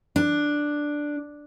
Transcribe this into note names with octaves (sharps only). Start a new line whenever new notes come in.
D4